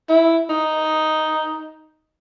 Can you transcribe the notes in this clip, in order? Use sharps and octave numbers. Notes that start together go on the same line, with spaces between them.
E4
D#4